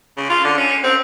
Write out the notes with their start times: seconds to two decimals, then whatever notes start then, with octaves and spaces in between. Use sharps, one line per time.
0.17 C#3
0.30 F4
0.44 D3
0.58 C#4
0.84 C4